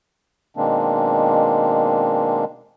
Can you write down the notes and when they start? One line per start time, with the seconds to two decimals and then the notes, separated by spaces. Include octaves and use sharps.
0.57 B2 D#3 G#3 A#3 C4 D4